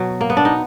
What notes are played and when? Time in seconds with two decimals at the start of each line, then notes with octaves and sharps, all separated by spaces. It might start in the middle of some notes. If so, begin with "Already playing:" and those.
Already playing: B2 F#3
0.21 A#3
0.30 B3
0.37 D4
0.45 D#4